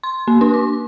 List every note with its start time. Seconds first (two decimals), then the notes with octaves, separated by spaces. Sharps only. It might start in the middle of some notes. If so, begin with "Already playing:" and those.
0.03 C6
0.28 A#3
0.41 D4
0.54 D6